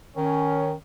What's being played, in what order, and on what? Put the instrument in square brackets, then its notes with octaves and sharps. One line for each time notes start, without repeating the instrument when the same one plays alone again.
[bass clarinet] D#3 [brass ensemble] C#4